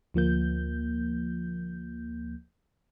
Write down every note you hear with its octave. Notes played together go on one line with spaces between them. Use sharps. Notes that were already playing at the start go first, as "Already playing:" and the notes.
D2 F3 A#3 G6